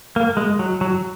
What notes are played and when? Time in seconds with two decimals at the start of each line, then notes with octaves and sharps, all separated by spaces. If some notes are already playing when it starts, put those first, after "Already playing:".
0.16 A#3
0.37 G#3
0.59 F#3
0.81 F#3